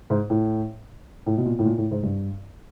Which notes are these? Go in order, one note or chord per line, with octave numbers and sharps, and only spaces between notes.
G#2
A2
A2
B2
A#2
A2
A#2
A2
G#2
G2